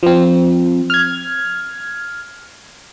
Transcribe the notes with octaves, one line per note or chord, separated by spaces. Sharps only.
F3 C4
F6 G#6